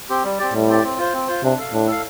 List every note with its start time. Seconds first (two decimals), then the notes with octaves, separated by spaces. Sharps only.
0.09 C4 G4
0.24 G3
0.39 C4 G4 D5
0.53 A2 G3
0.68 C4 G4 D5
0.84 C4
0.98 F4 C5
1.13 C4
1.28 F4 C5
1.43 C3 D4
1.58 A4 F5
1.73 A2 D4
1.87 A4 F5